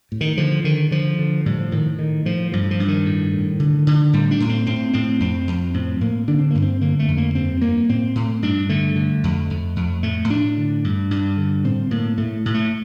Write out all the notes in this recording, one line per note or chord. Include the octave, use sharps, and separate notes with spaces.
A2
D#3
D3 F3
D3 D#3
D3 F3
D3
A2 G3
F3
A2 D#3
A2 D#3
A2 F3
G2 F3
F3
G2
D#3
A2
A2
D3
D3
A2 G3
D4
A2
C4
A2 C4
A2 C4
F2 C4
F2
A2 C4
A2 A#3
D3 D4
C4
G2 A#3
C4
D3 A#3
A3
F2
A#3
G2 C4
G2 A#3
A2 C4
A2
G2 D4
D3 A3
D3
F2
F2
F2
A2 A3
A2 D4
D3
G2
G2
D3
A2 C4
A2 A#3
A2 A3
A2
A3